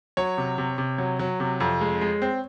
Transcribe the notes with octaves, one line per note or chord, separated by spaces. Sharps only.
F#3 C#5
C3
C3
C3
F#3
F#3
C3
F2
G#3
G#3
C4